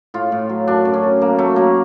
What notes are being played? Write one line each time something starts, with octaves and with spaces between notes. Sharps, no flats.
A2 F4
A2
F#3
F#2 D4
F#2
C#4
F#2
F#2 A#3
F#3 A3
F#3 A#3